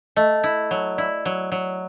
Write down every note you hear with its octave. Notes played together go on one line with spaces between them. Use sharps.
A3 D#5
E4
F#3
E4 D5
F#3
F#3